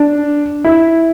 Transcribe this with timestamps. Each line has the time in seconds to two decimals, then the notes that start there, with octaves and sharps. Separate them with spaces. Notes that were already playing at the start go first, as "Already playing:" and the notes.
Already playing: D4
0.64 E4